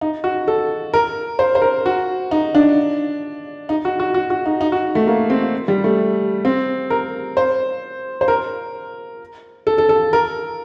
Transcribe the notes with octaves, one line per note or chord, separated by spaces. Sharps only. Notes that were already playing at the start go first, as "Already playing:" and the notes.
D#4
F#4
A4
A#4
C5
C5
A#4
F#4
D#4
D4
D#4
F#4
F#4
F#4
F#4
D#4
D#4
F#4
A3
A#3
C4
G3
A3
C4
A#4
C5
C5
A#4
A4
A4
A4
A#4